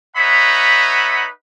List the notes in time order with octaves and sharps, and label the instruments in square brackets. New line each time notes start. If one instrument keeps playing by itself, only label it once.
[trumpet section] D#4 B4 C#5 E5 F#5 B5